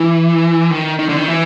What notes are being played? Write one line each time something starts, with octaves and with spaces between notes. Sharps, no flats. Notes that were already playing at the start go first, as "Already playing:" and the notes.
Already playing: E3
D#3
D#3
D3
D#3
E3